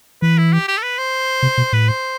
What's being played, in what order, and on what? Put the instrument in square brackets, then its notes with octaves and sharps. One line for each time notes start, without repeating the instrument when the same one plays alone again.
[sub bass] E3 [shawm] B4
[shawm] E4
G4
G4
A4
B4
C5
[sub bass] C3
B2
[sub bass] A2 [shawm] B4
[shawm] C5